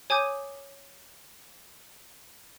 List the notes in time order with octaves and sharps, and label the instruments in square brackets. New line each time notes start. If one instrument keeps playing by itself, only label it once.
[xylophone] C#5 G#5 D6 D#6 G6